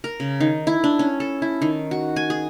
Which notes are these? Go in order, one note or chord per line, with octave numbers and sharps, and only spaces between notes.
A#4
C#3
D#3
E4
D4
C#4
A4
E4
D#3
F#4
G#5
G#4